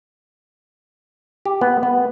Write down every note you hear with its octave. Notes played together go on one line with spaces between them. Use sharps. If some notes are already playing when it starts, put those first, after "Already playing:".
G4
B3
B3